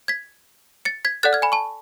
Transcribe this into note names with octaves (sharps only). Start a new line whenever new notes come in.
G#6 B6
A6 C#7
G#6 B6
A4 D5 F#5 F#6 A6
F6 G#6
G#5 B5
A5 C#6